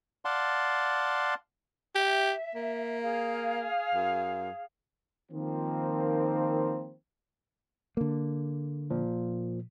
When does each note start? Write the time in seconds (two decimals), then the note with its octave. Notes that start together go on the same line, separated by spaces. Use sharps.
0.25 D5 F5 F#5 A5 C6
1.95 G4 E5
2.55 A#3
3.02 G#4 F5
3.95 F#2
5.32 D#3 F3 A#3 C4
7.97 D3 A#3
8.90 A#2 F3